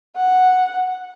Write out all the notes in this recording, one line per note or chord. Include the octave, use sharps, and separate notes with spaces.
F#5